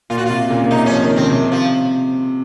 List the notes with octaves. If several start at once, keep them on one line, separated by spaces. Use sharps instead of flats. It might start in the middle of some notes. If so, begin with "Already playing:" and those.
A#2 F4
F#4
C3 F4
A#2 C#3
A#2
C3 D#4
C#4
F3
D#3
C#3 C4
C3
F3